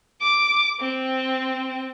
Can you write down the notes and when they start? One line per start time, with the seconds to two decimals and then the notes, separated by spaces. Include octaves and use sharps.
0.21 D6
0.80 C4